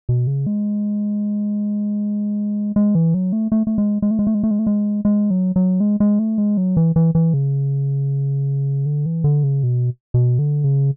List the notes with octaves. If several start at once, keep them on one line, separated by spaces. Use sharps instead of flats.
B2
C#3
G#3
G#3
E3
F#3
A3
A3
A3
G#3
G#3
A3
G#3
A3
G#3
A3
G#3
A3
G#3
G#3
F#3
F#3
G#3
G#3
A3
G#3
F#3
E3
E3
E3
C#3
D3
E3
D3
C#3
B2
B2
D3
C#3